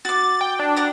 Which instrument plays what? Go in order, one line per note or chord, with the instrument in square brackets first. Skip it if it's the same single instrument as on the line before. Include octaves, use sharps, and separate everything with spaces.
[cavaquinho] F#4 D6 [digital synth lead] A6
[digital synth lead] G5
D4
[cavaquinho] F#4 D5 A#5